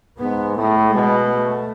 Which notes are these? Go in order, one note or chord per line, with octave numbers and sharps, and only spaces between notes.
G#2 B3
A2 A3
B2 G#3
A3